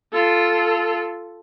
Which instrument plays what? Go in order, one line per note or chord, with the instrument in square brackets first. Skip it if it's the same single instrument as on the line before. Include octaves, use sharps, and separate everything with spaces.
[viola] F4 A4